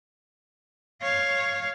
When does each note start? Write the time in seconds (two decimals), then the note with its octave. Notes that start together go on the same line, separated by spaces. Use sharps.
1.02 C#5 F5